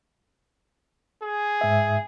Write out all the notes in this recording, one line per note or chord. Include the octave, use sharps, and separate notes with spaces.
G#4
G#2 E5